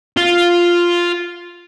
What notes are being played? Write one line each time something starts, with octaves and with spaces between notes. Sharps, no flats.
F4